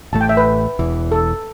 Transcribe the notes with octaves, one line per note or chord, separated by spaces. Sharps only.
A1 A2 A3 A5
G5
E5
B4
E1 E2 E3
A4